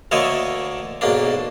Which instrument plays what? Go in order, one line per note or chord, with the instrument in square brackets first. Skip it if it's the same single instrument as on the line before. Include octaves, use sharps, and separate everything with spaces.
[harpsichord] D2 D3 A3 A#3 C#5 D#5
B1 G#2 A#3 D4